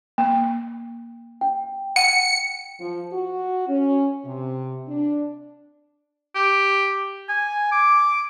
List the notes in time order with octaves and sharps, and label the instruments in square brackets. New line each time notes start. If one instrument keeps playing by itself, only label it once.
[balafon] A#3
[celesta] G5
[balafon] F#5 [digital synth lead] C#7
[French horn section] F3
F#4
C#4
C3
D4
[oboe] G4
G#5
D6